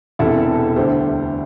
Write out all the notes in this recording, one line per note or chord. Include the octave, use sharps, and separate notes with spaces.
E1 E2 C3 E4 A4
D2 D3 G3 G4 C5